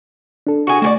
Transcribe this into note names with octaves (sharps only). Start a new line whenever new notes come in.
D4 A4
F#4 G#4
A3 F#4 G#4 D5